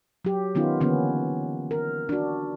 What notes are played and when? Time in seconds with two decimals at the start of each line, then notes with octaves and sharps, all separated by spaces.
0.25 F#3 G4
0.55 D#3 B3 C#4 D#4 F4
0.81 D3 E3 A#3 B3 C#4
1.71 A#4
2.09 D4 F#4